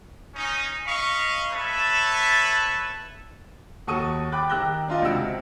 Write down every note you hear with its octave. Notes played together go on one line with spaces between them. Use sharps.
C#4 D#4
D#5 F5 B5 C#6
A4 B4 C#5 E5 A5
D#2 F#4 A4 C#6 D#6 D#7
G5 B5 D6 F#6 A6
D#3 G4 E6 F#6 A#6 G7
D4 F4 D#5 F5
C#2 C3 C4 F#4 E6 D7